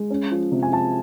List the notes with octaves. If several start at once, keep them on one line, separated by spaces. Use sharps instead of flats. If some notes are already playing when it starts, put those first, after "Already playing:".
Already playing: G#3
C#4
F3
C3
G#5
F3 A5